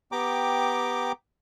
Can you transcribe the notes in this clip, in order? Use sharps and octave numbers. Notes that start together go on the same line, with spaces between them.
B3 G4 G5 A#5 D6